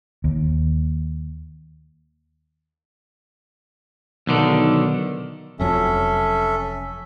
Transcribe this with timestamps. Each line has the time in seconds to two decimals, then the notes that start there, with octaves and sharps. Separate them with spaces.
0.24 D#2
4.27 B1 D3 D#3
5.59 F1 F2 F#3 C#4 A4 E5